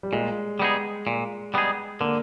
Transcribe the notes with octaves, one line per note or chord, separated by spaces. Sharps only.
G3
A#2 G#3
G3 B3 D#4 G#4
A#2
G3 B3 D#4 G#4
D3 A#3